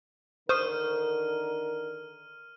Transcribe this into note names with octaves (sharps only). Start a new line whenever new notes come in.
D3 D#3 A#4 C5 C#6 D#6 F6 D#7